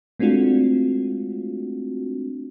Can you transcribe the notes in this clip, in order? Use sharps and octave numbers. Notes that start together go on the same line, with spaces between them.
G#3 A3 C4 D4 F4 F#4